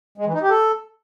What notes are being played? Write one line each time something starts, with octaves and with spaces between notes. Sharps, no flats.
G#3
E3
D#4
G4
A4